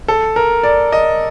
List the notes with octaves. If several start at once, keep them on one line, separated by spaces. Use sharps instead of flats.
A4
A#4
D5
D#5